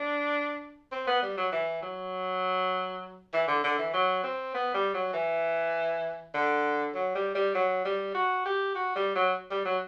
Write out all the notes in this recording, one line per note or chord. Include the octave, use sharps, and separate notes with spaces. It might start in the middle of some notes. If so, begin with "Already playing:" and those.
Already playing: D4
C4
B3
G3
F#3
E3
F#3
E3
D3
D3
E3
F#3
C4
B3
G3
F#3
E3
D3
F#3
G3
G3
F#3
G3
F#4
G4
F#4
G3
F#3
G3
F#3